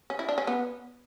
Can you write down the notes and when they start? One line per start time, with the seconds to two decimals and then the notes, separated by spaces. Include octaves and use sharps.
0.10 C#4
0.19 E4
0.29 D4
0.38 C#4
0.47 B3